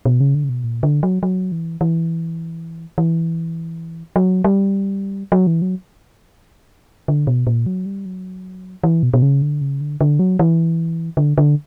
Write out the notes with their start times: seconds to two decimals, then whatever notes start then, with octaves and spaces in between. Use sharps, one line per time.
0.05 B2
0.20 C#3
0.35 D3
0.44 C#3
0.49 B2
0.64 A#2
0.83 D3
1.03 F#3
1.23 F#3
1.52 E3
1.81 E3
2.98 E3
4.16 F#3
4.44 G3
5.32 F#3
5.47 E3
5.62 F#3
7.08 D3
7.27 B2
7.47 A#2
7.66 F#3
7.86 G3
8.06 F#3
8.84 E3
9.03 B2
9.14 B2
9.22 C#3
9.42 D3
9.61 C#3
9.81 D3
10.01 D3
10.19 F#3
10.39 E3
11.17 D3
11.38 D3